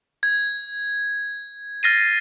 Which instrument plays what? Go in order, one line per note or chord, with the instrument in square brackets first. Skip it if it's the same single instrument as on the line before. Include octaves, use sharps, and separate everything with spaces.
[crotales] G#6
F6 A6 A#6 C7 D#7